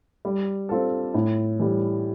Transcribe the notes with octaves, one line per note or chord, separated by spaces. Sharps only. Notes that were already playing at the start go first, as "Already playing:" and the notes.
G3
C4 F4 A4
A2
E3 G3